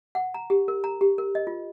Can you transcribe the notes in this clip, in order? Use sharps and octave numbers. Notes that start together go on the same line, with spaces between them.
F#5
A#5
G4
A#4
A#5
G4
A#4
D#5
F4